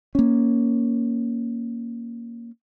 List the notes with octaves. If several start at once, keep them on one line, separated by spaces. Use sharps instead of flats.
A#3 C#4